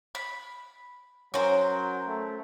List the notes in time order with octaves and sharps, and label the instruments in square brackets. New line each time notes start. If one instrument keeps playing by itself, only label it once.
[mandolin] B5
[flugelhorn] F#3 [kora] C#4 [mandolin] A#4 C5
[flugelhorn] A3